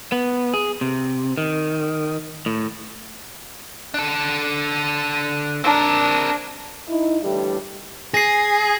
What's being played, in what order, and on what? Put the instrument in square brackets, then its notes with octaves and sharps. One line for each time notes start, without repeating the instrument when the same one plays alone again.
[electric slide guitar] B3
G#4
C3
D#3
A2
[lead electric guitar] D4 A4
[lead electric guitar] C4 A#4 [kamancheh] D4
[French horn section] D#4 E4
A2 D3 E3 G3
[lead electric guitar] G#4 [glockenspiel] A#6 C7